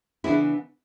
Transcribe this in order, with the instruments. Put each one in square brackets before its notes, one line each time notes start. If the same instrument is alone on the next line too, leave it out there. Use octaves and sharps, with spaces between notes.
[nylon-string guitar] C#3 E3 B3 D4 E4 G#4